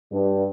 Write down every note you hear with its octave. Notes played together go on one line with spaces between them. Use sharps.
G2